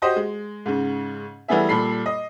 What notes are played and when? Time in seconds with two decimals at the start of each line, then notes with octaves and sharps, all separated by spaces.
0.02 F#4 G4 C5 D#5
0.16 G#3
0.66 G#2 C#3
1.48 E3 G3 A3 B3 G#4 E5
1.69 A#2 G3 A4 B5 C7
2.06 D#5